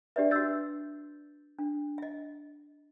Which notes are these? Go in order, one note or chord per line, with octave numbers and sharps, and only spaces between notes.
D4 G4 B4 D5 E5
F#4 B4 E6 G6 A6
D4
D#5 E5